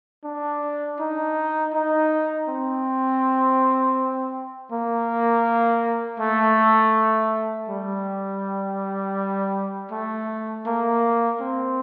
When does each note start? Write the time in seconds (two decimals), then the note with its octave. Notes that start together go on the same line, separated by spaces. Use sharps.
0.24 D4
1.00 D#4
1.73 D#4
2.48 C4
4.72 A#3
6.20 A3
7.69 G3
9.92 A3
10.66 A#3
11.40 C4